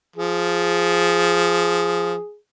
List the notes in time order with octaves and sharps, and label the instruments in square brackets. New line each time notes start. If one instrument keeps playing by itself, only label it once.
[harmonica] F3 [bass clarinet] G#4